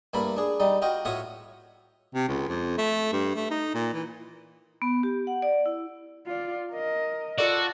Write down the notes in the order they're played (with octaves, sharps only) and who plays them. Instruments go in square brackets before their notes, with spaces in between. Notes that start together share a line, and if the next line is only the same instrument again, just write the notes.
[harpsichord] G2 A3 A#3 E4 D5 B5
D4 G#4
G3 D#4 D5
F4 F#4 D#5 G5
A2 F4 F#4 C#5 E5 D#6
[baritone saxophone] C3
C#2
F2
A3
G2
A3
D#4
A#2
E3
[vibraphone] B3
G4
F#5
D5
E4
[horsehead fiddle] F4 D5
A#4 D#5
[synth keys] F4 A4 D5 [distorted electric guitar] F#4